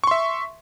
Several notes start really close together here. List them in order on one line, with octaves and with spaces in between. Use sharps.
C#6 C6 E5